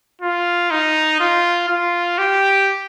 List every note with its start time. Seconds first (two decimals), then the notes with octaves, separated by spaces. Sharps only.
0.22 F4
0.71 D#4
1.20 F4
1.69 F4
2.18 G4